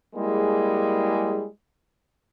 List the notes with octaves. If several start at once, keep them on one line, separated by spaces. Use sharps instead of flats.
G3 G#3 A#3 E4 G#4